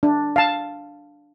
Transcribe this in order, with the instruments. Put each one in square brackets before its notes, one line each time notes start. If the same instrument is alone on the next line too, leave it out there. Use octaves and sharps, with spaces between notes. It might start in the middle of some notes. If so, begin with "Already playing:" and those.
[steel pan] D4
F5 A5